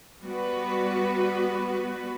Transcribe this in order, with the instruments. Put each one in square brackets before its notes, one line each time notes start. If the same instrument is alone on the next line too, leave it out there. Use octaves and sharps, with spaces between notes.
[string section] G3 B3 F#4 B4